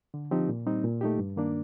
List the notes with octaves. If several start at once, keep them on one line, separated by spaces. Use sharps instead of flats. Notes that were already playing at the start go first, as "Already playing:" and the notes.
D3
F3 C4 D#4 G4
A#2
G3 C4 D#4
A#2
A3 D#4 G4
G2
D#3 A#3 D4